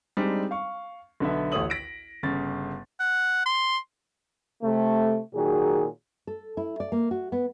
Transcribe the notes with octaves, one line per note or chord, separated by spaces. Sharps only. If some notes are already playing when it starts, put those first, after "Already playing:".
G3 G#3 C4 D4 D#4
F5 C#6
B1 D3 B3 E5
A1 D2 A3 C#5 D#6 F#7
A#6 B6 D7
G1 C#3 A6
F#5
C6
C3 A3
A#2 D#3 F#3 G#4
A4
E4
D5
A#3
F#4
B3